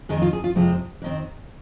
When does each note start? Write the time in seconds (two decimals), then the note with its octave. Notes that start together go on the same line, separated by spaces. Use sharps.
0.09 F2 D#3 G#3 C4 G#4
0.22 F4
0.33 G#4
0.44 F4
0.56 F2 C3 G#3 C4 F4
1.02 F2 D#3 C4